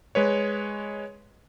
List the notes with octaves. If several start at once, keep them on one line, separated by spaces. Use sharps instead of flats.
G#3 B4 C#5